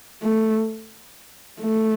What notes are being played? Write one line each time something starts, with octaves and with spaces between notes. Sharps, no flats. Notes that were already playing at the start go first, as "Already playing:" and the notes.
A3
A3